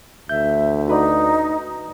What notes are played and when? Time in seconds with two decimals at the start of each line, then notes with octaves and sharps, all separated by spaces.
0.29 D2 E5 G6
0.88 D#4 F#4 B4 D5